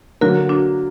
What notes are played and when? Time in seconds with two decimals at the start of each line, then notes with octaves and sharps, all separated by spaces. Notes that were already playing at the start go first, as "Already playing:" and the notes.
0.21 D3 F#3 A#3 F#4 A#4
0.49 D4 F#4